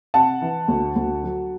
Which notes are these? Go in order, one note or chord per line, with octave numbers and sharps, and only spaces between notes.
C3 F#5 A5
E3
D2
D2
F#3